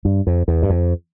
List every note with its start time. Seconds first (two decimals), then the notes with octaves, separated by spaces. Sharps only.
0.05 G2
0.27 F2
0.48 E2
0.63 G2
0.70 F2